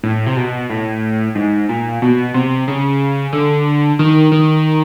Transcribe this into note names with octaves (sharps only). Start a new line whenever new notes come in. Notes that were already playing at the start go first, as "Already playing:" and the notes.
A2
C3
B2
A2
G#2
A#2
B2
C3
C#3
D3
D#3
D#3